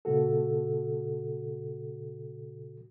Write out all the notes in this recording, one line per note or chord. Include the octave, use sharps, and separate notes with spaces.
A#2 C#3 F#4 A4